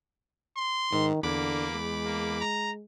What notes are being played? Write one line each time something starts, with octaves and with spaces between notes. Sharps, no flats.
C6
G#2 D#3
E2 D3 A#3 B5 D6
G#3
A#3
A#5